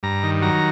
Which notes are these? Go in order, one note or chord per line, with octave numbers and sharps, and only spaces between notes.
G2 A#5
D#3
F#3 A#5